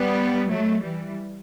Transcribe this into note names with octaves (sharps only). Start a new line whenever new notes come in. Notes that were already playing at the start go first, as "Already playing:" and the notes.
Already playing: G3 B3
F#3 A3
E3 G3